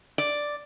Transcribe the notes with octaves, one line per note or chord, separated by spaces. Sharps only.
D5